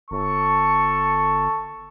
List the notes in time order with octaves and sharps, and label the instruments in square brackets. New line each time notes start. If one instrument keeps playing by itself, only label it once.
[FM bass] G1 [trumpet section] A4 A5 C#6